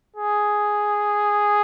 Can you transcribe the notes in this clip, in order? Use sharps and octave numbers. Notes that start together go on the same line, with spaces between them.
G#4